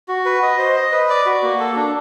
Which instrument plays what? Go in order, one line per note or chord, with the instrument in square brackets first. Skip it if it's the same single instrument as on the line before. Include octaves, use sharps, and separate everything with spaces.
[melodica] F#4
B4
D#5
C5
D#5
B4
D5
F#4
A#3
A4
D4